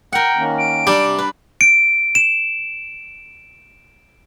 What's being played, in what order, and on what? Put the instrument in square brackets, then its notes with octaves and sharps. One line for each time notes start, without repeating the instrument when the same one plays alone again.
[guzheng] A#4 F#5 [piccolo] G5
[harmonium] D#3 A#3 C#4
[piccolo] D7
[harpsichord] G3 [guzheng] D4
[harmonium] C3
[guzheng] B4
[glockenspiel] D7
E7